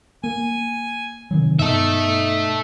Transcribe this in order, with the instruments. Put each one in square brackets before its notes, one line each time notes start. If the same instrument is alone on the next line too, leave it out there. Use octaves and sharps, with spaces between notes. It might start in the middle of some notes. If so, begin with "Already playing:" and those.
[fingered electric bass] A#3 [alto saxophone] G#5
[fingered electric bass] C3 D#3 F#3
[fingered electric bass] G2 B2 [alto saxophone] D#4 [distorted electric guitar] A4 E5